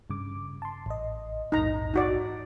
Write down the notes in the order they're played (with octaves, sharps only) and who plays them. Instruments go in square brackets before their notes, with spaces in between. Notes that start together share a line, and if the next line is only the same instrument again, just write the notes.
[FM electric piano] G2 C#3 D6
A5 C6
A1 D#5
[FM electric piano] A#1 E2 G#2 [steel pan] D#4 A#5
[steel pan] D#4 F#4 D5